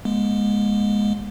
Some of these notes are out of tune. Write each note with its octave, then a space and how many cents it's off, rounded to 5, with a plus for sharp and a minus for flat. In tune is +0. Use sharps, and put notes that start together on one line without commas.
G#3 +0 B3 -45